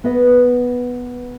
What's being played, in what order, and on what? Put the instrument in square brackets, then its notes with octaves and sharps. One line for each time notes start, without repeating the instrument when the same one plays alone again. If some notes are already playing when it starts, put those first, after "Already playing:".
[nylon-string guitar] B3 B4 D#5